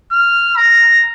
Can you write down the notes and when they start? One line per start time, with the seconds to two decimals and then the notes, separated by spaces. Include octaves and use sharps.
0.12 F6
0.57 A#5